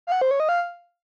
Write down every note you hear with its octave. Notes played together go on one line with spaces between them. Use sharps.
F5
F#5
C5
C#5
D#5
F5